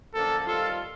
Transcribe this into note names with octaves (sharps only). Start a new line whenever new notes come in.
F#2 D3 F3 A#3 D4 A4
D#3 G3 C4 F4 A4